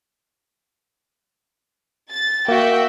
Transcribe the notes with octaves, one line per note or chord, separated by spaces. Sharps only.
A6
A#3 F#4 E5 G5